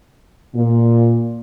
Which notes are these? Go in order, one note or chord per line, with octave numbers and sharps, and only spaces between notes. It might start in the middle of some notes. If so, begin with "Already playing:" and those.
A#2